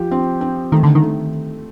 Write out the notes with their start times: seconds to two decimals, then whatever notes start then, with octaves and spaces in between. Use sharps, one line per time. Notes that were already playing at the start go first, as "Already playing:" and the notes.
Already playing: F3 G4
0.11 C4
0.41 C4
0.72 D#3 A3
0.83 D3
0.95 D#3
1.02 A3